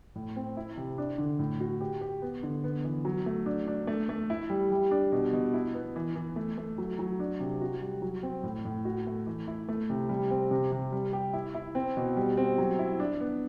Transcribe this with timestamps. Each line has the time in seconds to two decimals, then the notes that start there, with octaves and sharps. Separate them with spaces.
0.15 A2
0.36 C4
0.57 E4
0.77 C3
0.98 D4
1.18 D3
1.39 A2
1.60 F#4
1.81 G4
2.01 G4
2.22 B3
2.43 D3
2.64 B3
2.84 E3
3.05 F#3
3.26 A3
3.46 D4
3.67 D4
3.87 A3
4.09 A3
4.30 E4
4.50 G3
4.71 G3
4.91 D4
5.12 B2
5.33 B2
5.54 E4
5.74 B3
5.96 E3
6.15 E3
6.36 A3
6.58 A3
6.78 F#3
6.99 F#3
7.20 D4
7.40 C3
7.61 F#4
7.82 G3
8.02 F#3
8.23 C4
8.43 A2
8.65 A2
8.85 F#4
9.07 A3
9.27 E3
9.48 E4
9.69 A3
9.90 C3
10.09 G3
10.31 C4
10.51 C3
10.72 C3
10.92 G3
11.13 G4
11.33 E4
11.55 E4
11.75 C4
11.97 B2
12.17 G3
12.37 C4
12.58 F#3
12.79 E4
13.00 D4
13.21 B3